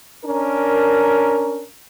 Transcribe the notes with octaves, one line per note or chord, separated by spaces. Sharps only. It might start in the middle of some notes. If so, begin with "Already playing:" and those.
C#4 D4 A#4